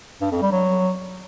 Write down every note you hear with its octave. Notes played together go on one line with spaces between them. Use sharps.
G2
F2
G3
F#3